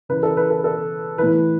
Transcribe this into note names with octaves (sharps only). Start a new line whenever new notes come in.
C#3 E3 B4
A4
B4
A4
A4
A2 E3 B4